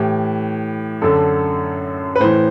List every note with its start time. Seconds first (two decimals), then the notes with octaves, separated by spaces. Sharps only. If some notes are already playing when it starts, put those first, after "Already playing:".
Already playing: A2 E3 G4
1.02 F#2 D3 A4
2.16 B4
2.20 A2 E3 C5